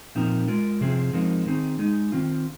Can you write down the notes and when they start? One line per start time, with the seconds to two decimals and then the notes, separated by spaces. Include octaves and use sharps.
0.15 A#2 F3 C4 D#4 A#4
0.48 G#3 F4 A#4
0.81 C3 F3 C4 G#4
1.13 F3 G#3 C4 D#4 A#4
1.46 D#3 C4 D#4 G#4
1.79 G#3 D#4 G#4
2.12 D#3 C4 F4